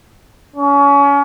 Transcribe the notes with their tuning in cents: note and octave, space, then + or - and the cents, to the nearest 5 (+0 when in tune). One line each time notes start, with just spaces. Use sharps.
C#4 +30